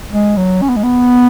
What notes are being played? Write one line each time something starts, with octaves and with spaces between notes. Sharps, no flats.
G#3
F#3
C#4
B3
G#3
B3